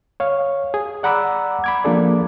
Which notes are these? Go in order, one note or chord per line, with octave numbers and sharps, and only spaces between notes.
C#5 F5
G#4
D5 F#5 A#5 B5 D6 E6
B5 D6 G#6
F3 A#3 D4 G#4 A4 D5